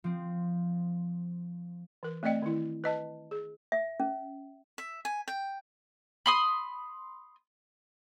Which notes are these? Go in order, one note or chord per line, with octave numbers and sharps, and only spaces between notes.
F3 C4
E3 A#4
A3 C4 D5 D#5 G5
D#3 E4
B4 D#5 A5
G#4
E5
C#4
E5
G#5
G5
B5 C6 D#6